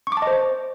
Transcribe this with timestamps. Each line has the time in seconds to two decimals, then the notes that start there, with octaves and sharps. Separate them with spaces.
0.07 C#6
0.12 D6
0.17 A5
0.22 D#5
0.27 C5